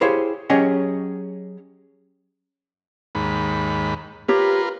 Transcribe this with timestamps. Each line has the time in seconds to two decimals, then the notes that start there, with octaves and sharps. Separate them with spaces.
0.01 E4 G4 G#4 C5 C#5 F5
0.50 F#3 C#4 G4 G#4 C#5 D#5
3.15 D#2 G#2 B5
4.28 F4 G4 A#4 B4 C#5